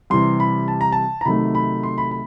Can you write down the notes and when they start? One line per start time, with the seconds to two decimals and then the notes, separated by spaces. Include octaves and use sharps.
0.10 C3 E3 G3 C6
0.40 B5
0.68 A5
0.81 A#5
0.92 A5
1.21 A#5
1.25 C3 D#3 F#3 A3 B5
1.55 B5
1.83 C6
1.98 B5
2.11 B5